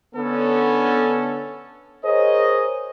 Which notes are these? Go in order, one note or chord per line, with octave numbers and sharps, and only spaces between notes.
D3 B3 C#4 A4
G#4 A#4 C5 C#5 D#5